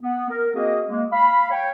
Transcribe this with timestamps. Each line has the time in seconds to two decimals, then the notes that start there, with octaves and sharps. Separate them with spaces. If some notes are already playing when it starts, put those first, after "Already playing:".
0.02 B3
0.30 A#4
0.55 A#3 C4 F#4 G#4 D#5
0.89 G#3 A#3
1.13 F5 B5
1.51 C#5 G5